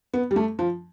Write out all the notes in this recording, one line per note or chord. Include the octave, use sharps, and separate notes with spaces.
B3
G3
A3
F3